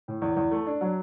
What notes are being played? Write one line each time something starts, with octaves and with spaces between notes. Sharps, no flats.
A2
E2
E2
A3
D4
F#3